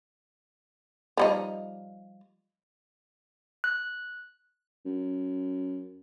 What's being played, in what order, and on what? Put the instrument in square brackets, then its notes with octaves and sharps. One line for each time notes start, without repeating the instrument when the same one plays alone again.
[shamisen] F3 G3 D#4
[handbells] F#6
[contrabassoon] F#2